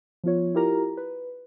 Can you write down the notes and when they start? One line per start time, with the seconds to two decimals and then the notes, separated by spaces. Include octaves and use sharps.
0.24 F3 B3 F4 C#5
0.54 E4 F4 G4 A#4 A#5
0.97 B4